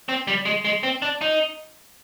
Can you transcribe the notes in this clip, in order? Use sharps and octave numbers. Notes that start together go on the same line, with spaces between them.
C4
G3
G#3
G#3
C4
D4
D#4